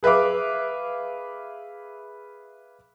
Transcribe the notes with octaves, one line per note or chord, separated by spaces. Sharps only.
G#4 B4 E5 F5 D6